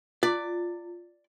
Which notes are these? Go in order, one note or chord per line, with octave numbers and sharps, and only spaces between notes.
F4 D5